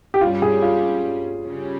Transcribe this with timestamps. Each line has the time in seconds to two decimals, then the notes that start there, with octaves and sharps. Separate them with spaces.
0.14 G4
0.21 G2 G3 C#4 F4
0.42 G#4
0.62 F4
1.45 C#3 G3 C#4